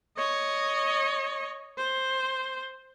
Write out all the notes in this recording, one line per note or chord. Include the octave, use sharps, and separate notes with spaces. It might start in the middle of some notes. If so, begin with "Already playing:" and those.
C#5 D#5
C5